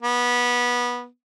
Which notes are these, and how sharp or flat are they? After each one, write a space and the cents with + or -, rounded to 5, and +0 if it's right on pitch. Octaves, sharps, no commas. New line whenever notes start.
B3 -20